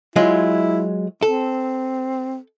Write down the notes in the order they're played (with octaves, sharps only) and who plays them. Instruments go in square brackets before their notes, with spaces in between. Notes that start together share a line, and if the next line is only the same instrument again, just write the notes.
[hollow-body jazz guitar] F#3 G#3 F4 [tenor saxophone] E4
[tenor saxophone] C4 [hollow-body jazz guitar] A4